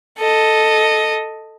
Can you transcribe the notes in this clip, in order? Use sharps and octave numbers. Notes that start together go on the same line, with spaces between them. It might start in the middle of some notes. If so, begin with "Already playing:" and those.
A4 D#5